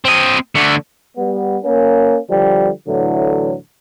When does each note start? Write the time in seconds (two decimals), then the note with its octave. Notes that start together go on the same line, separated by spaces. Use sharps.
0.05 C4 D#5
0.55 D3 A3
1.17 G3 B3
1.64 A#3 C#4
2.30 D3 F3 G3
2.87 A2 D3 E3 F#3